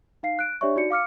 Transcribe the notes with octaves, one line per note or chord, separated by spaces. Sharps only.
D#4 F5 C7
F#6 D7
D4 G4 C#5 D5 E5 C#6
D#4 F#4 D5 C#7
F5 D6 F6 C#7